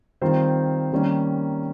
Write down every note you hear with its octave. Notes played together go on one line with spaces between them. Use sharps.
D#3 G3 C4 F4 C5
D#3 G3 A#3 C#4